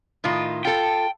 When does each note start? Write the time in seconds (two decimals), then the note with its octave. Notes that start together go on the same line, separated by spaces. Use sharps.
0.24 A2 D#3 F4
0.65 F4 A4 G5